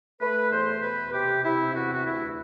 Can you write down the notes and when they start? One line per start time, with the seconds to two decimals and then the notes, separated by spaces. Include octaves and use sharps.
0.21 A3 B4
0.51 E2 C5
0.82 B2 B4
1.13 C3 G4
1.44 C3 E4
1.75 E2 F#4
1.94 F#4
2.05 D2 E4